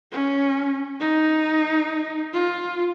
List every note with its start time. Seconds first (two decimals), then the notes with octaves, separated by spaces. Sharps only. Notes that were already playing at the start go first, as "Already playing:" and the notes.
0.12 C#4
1.00 D#4
2.33 F4